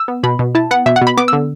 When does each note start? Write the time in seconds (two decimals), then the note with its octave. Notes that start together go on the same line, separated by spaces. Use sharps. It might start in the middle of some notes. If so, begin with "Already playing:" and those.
Already playing: E6
0.08 B3
0.23 B2 B5
0.39 B2
0.55 E4 A5
0.71 B3 F#5
0.86 B2 E5
0.96 F#5
1.01 B2
1.07 B5
1.17 B3 D6
1.28 D3 E6